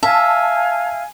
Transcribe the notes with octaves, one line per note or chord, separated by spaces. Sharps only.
E5 F5 G#5 A5